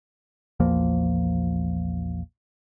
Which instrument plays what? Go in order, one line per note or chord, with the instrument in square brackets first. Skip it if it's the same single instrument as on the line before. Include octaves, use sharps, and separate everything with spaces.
[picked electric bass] A#1 E2 F3 A#3